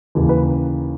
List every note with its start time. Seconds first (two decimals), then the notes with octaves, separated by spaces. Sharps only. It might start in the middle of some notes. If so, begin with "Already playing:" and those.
0.15 D#2 C#3 E3 G#4
0.29 B4